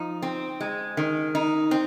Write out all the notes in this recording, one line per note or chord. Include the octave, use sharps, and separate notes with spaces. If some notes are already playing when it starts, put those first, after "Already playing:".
Already playing: F3 D#4
C4
G#3
D#3
D#4
C4